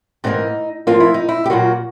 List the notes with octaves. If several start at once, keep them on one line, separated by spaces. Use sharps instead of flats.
G#2 E3 G3 A#3 D#4
G#2 F3 A#3 F4
E4
D#4
E4
G4
A#2 F#3 A#3 F#4